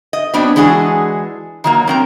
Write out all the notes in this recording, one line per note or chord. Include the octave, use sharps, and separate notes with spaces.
D#5
F#3 B3 C4 D4 D5
E3 G#3 D4 F#4 G#4
D#3 F#3 A#3
F#3 C4 A#4